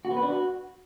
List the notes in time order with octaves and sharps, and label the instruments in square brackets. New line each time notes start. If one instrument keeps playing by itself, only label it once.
[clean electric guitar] F#4
B3
B4
D4
F#4